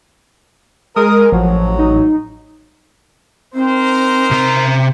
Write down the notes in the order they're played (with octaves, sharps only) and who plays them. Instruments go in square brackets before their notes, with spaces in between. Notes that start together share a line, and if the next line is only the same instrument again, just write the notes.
[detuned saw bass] G#3 [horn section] A#4 [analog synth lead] D#6
[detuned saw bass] A1 [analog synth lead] F3 [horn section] F#3
[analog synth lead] D#4
[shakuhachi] C4 [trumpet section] D#4 A#4 C5
[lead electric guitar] C3 A#5